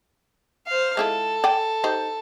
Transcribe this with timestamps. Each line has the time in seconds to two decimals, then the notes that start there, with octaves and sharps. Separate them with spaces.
0.67 C5 F5
0.97 G#3 E4 F4 A4
1.44 D5 G5 G#5
1.84 D#4 G4 C5